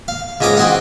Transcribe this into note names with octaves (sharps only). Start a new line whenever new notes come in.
F5
C#2 G#2 C#4 D#5 D6
C4 F#4 G#4 F#5